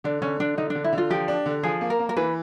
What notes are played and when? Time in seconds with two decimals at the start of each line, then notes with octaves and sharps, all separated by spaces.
0.04 D3 D4
0.22 D3 C#4
0.40 D3 D4
0.57 D3 D#4
0.70 D4
0.75 D3
0.84 E4
0.93 D3
0.98 F4
1.10 F3 G4
1.28 D4
1.46 D3
1.63 F3 G#4
1.81 A#3
1.90 A#4
1.99 A#3
2.09 A#4
2.17 E3 B4